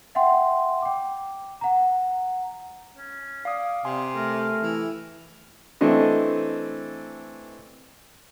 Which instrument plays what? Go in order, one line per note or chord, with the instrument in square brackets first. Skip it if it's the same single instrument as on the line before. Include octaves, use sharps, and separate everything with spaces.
[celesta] E5 F#5 G5 C6
G5 D6
F#5 A#5
[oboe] C#4
[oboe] D5 [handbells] F5 D#6
[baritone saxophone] C3 [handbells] G#5 C6
[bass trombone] A3 [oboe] A#4
[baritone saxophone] E3
[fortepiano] E3 A3 C4 D4 D#5